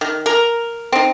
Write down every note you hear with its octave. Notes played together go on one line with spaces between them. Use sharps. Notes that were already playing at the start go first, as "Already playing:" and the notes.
D#3
A#4
C4 D#4